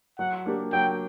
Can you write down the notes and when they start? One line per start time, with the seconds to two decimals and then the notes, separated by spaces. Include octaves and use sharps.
0.19 F#3 F#5
0.46 A#3 D4 G4
0.72 F#3 G5